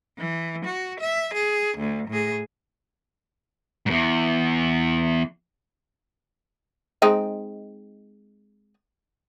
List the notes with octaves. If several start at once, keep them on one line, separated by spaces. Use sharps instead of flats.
E3
F#4
E5
G#4
D2
A2 G#4
E2 G#2
G#3 C4 D#4